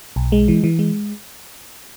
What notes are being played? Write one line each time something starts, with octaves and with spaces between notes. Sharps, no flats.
B1
G#3
E3
E3
G#3